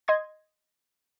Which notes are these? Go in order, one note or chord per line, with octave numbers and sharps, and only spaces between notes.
D#5 C6 G#6